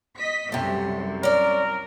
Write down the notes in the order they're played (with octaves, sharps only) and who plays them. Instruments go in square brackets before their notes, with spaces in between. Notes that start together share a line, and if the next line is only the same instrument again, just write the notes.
[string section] D#5 B6
[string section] C2 F#2 [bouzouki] C3 A3
[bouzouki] C#4 D5 [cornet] A#4